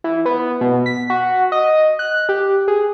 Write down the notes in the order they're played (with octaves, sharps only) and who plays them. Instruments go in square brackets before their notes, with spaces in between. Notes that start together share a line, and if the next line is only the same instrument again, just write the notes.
[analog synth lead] E3
B3
B2
B6
F#4
D#5
F#6
G4
G#4